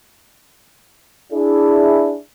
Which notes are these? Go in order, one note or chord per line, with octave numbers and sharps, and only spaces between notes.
D4 E4 G#4